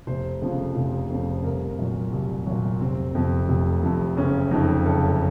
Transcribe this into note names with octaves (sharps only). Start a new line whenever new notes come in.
F1 C5
F2 C#3 F3
F1
F2 C#3 F3
C2 A#4
A#2 F#3
C2
A#2 F#3
F1 C4
F2 C3
F1
F2 C3
F#1 C#4
F2 C3 D#4
F#1 A4